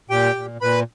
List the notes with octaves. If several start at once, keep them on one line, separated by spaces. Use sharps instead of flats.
A#2 G4 G5
A#2
A#2 B4 B5